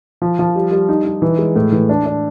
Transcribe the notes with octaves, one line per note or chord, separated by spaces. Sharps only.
F3
F3
G3
G3
D#4
D#4
E3
G#3
A2
E3
D4
D4